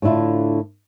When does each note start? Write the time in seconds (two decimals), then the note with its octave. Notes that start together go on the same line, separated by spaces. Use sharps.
0.02 A2 D3 D4 E4 F4